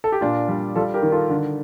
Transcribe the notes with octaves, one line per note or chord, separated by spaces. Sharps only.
A4
G4
A#2 D4 F4
G3
G3 F4 A4
G4 A#4
D#3
F4 A4
D3